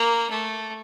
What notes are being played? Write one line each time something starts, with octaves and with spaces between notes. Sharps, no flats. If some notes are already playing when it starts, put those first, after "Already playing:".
Already playing: A#3
A3